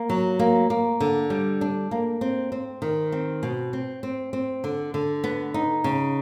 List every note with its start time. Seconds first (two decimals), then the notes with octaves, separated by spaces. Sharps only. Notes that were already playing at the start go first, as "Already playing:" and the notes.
Already playing: A#3
0.10 F#3
0.39 A#3
0.70 A#3
1.00 D3
1.30 G3
1.61 D4
1.91 A#3
2.21 C4
2.52 C4
2.82 D#3
3.12 C4
3.43 B2
3.73 C4
4.03 C4
4.33 C4
4.64 D3
4.94 D3
5.24 B3
5.54 D#4
5.84 C#3